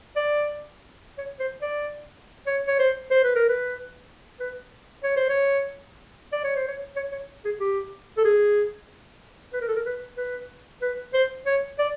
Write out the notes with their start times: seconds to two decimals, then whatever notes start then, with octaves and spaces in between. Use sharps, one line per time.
0.16 D5
1.18 C#5
1.40 C5
1.62 D5
2.47 C#5
2.68 C#5
2.79 C5
3.11 C5
3.24 B4
3.36 A#4
3.49 B4
4.40 B4
5.04 C#5
5.17 C5
5.29 C#5
6.33 D5
6.44 C#5
6.56 C5
6.68 C#5
6.96 C#5
7.12 C#5
7.45 G#4
7.60 G4
8.18 A4
8.25 G#4
9.54 B4
9.61 A#4
9.68 A4
9.76 A#4
9.86 B4
10.17 B4
10.82 B4
11.14 C5
11.46 C#5
11.79 D5